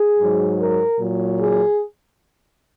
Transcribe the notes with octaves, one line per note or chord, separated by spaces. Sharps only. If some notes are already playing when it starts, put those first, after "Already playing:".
Already playing: G#4
G#2 F#3
A#4
A#2 F#3
G#4